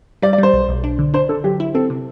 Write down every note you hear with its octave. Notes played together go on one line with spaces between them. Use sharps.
G3 D5
D5
G3 C5
B1
B1
D4
D3
D4 C5
D3 A4
F#3 G4
E4
C4 A4
C3